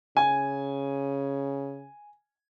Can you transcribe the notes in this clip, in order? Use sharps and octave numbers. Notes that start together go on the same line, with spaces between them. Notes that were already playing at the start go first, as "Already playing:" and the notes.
C#3 G#5